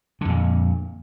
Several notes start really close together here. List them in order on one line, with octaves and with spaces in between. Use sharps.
D3 F2 A#2